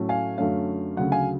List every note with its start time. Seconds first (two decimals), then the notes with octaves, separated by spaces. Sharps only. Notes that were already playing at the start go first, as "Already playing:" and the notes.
Already playing: A2 F#3 A3 C#4
0.09 F5 G#5
0.38 F#2 D3 F#3 A3 C#4 F5
0.97 D2 C#3 F#3 F#5
1.12 F5 G#5